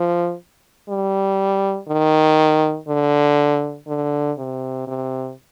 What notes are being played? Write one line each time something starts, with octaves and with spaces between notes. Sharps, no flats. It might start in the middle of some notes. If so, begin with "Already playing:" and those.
Already playing: F3
G3
D#3
D3
D3
C3
C3